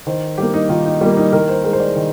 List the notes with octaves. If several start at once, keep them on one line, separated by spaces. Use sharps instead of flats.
D#3 C5
G3 A#3 G4
D#4
D#3 F4
D#4
G3 A#3 F4
D#4
D#3 A#4
C5
G#3 A#4
C5
D5
D#3